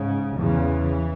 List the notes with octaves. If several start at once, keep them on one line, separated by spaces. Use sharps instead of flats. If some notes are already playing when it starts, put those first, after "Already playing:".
Already playing: G#2 C#3
E2 C#3 E3